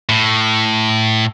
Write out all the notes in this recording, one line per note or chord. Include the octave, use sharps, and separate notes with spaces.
A2